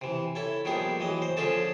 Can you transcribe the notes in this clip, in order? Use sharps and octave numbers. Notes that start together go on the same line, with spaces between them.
C3 E3
E4 A4 C#5
A#1 D#3 G3 B3 G#4
E3 F#3 D#5
C5
D3 F3 C#4 G#4 A4 A5